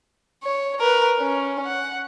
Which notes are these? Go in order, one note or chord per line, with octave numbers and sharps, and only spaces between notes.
C#5
A#4 B4
C#4
F#5